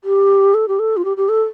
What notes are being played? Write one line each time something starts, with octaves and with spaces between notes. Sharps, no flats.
G4
A4
G4
A4
F4
G4
G4
A4